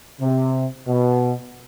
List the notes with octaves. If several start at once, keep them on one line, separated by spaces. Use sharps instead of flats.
C3
B2